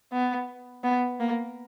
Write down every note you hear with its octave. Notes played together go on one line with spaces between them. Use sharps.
B3
B3
A#3